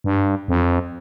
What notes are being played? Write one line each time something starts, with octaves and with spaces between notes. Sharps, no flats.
G2
F2